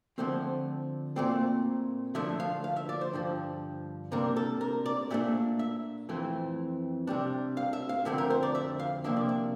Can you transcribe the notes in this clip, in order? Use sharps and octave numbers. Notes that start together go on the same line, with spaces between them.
D3 F3 A3 C4 C5
A#2 A3 C4 D5
D3 F3 A3 D4 E5
F5
F5
E5
D5
C5
G2 D3 F3
C3 G3 A#3 D4 A#4
A4
A#4
D5
A#2 A3 D4 E5
E5
F2 E3 A3 C4
C3 G3 D4
F5
E5
F5
F2 D3 A3 C4 E5
A#4
C5
D5
E5
F5
C3 F3 A#3 D4 E5
D5
E5